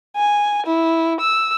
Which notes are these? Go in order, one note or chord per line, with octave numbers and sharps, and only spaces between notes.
G#5
E4
E6